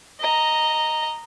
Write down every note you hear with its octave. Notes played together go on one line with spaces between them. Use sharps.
D#5 A#5